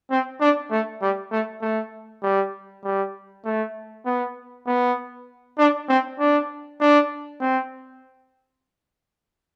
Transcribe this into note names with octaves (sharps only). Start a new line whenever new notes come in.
C4
D4
A3
G3
A3
A3
G3
G3
A3
B3
B3
D4
C4
D4
D4
C4